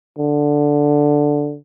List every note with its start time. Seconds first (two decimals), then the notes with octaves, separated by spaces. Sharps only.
0.18 D3